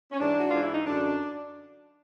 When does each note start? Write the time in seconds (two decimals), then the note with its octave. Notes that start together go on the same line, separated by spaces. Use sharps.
0.12 C#4
0.20 G#2 E3 D4
0.39 F#4
0.51 G#2 E3 F4
0.63 E4
0.74 D#4
0.87 F#2 D3 D4